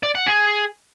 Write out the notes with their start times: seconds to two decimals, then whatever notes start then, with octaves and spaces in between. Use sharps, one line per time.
0.03 D5
0.15 F#5
0.27 G#4